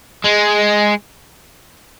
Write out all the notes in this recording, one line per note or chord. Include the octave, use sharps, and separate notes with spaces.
G#3